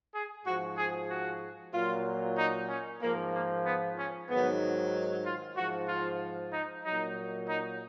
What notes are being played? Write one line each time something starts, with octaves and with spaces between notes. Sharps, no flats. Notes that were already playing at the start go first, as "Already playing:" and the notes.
G#4
G#2 F3 F#4
G#4
F#4
A#2 F#3 F4
D#4
C#4
G#2 F3 A#3
A#3
B3
C#4
G#2 D#3 F#3 B3
F4
G#2 F3 F#4
F4
D#4
A#2 F#3 D#4
D#4